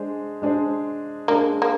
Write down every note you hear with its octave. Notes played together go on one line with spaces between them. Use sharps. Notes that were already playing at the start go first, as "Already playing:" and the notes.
Already playing: G#3 D4 G#4 C5
G#3 D4 G#4 C5
G#3 A#3 D4 G#4 C5
A#3